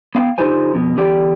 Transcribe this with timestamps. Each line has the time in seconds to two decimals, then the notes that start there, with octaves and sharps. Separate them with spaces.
0.15 B3 F5 G5
0.38 D3 D#4 F4 G4 C5 G#5
0.74 F2 B2
0.97 E2 D3 G4 D5 G5